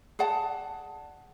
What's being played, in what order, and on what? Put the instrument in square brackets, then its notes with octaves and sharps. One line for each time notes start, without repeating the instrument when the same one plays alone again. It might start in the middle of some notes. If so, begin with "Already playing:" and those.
[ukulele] G#4 D5 F#5 A5